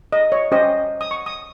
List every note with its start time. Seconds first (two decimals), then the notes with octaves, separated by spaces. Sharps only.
0.13 D#5
0.32 C#5
0.52 C#4 G4 C5 D#5
1.01 D#6
1.11 C#6
1.26 D#6